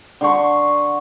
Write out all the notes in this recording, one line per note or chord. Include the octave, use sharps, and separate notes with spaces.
D3 C6 C#6